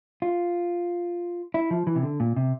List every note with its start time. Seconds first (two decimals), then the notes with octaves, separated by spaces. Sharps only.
0.22 F4
1.54 E4
1.71 F3
1.87 E3
1.96 C3
2.03 D3
2.20 A#2
2.37 C3